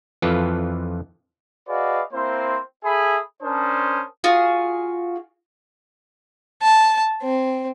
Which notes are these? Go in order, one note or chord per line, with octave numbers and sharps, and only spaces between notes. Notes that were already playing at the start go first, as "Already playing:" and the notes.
F2 E3 F3 F4 A4 B4
F#4 G#4 B4 D5 D#5 F5
A#3 C4 E4 C5
G#4 A4 E5 G#5 B5 D#6
C#4 D4 A#4 C5 A5 D#6
F4 F#4 G#4
A5
C4